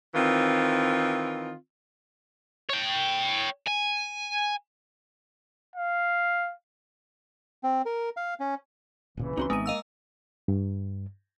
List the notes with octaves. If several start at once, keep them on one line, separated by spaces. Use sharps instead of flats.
D#3 E3 C4 F4
C#5 G5
G#5
F5
C4
A#4
F5
C#4
D1 A#2 C#3 E3
C#2 C4 C#4 D#4 F#4 C6
G#1 G#3 B3 C4 D#4 E5 D#7
A#3 D#5 F5 E6
G2